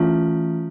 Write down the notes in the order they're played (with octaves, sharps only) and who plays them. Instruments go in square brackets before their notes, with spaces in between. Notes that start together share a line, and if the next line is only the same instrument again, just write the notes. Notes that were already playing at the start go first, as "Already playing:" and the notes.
Already playing: [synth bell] E3 A3 C#4 F4